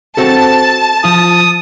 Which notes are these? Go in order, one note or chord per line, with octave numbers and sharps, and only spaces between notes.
C4 F#4 A4 A5
F3 F4 D#6